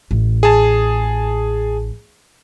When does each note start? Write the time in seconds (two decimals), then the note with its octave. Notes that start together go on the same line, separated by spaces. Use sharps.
0.11 A1
0.43 G#4 A5